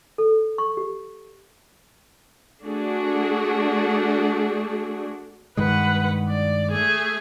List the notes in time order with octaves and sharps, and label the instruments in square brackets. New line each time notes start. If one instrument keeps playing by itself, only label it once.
[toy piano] A4
C#6
G4
[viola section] A3 D4 F#4 G#4
[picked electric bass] G2 D#3 G#3 [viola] B4 F#5
[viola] D5
A3 G#4